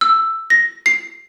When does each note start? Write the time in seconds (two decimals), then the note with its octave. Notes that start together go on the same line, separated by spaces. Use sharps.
0.01 E6
0.50 A#6
0.86 C7